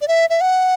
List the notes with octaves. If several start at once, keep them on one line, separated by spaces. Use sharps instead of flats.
D5
E5
E5
F#5